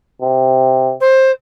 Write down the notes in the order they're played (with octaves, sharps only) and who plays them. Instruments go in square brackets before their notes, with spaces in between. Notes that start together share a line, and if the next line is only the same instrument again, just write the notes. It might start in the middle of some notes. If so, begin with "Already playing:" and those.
[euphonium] C3
[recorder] C5